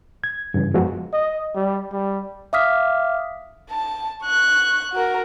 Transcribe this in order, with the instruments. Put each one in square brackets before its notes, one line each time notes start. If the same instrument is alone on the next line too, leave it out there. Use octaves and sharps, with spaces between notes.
[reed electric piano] G#6
G2 C#3 E3
F#2 F3 G#3 B3 F#4
[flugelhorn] D#5
G3
G3
[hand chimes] E5 F5 D6 D#6 F6 B6
[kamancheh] A5
C#6 F#6
F#4 A#4